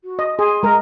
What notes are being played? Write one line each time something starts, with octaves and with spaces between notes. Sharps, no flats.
F#4
D#5
G#4 C6
G#3 A#4 A#5